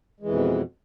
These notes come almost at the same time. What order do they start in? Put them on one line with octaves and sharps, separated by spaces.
G#3 E3 F2 B2